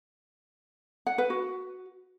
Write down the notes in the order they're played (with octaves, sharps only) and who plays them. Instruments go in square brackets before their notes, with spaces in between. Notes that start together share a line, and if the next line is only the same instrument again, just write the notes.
[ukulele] F#5
B4
F#4